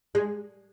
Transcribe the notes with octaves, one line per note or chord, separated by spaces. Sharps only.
G#3